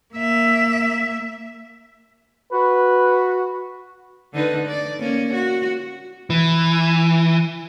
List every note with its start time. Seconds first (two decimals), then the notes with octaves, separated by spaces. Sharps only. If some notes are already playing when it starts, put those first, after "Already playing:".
0.14 A#3 E5
2.53 F#4 B4
4.34 D3 D#4 B4
4.67 D5
5.00 A#3 C#4
5.34 F#4
6.30 E3